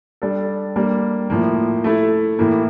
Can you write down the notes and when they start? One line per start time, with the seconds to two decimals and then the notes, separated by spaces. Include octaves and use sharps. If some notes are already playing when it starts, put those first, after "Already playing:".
0.22 G3 D4 A4
0.76 G3 A#3 D4
1.30 A2 F3 A#3
1.84 A3 E4 A4
2.39 A2 E3 A#3